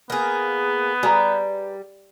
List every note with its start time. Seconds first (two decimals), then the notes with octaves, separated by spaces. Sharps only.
0.10 A#3 B3 G#4
1.03 G3 G#4 B4 A#5